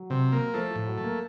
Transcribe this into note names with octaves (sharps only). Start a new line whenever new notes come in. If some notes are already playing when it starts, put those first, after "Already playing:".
Already playing: F#3
C3
A#3
F3 A3
F3
A2
F#3
A3
A#3